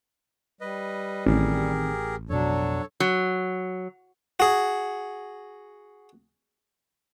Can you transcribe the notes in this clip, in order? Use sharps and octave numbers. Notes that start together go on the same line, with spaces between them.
G3 B4 D#5
A1 D#3 C4 G4 G#4 A#4
F2 B2 F#3 D4 A4 C#5
F#3
F#4 G#4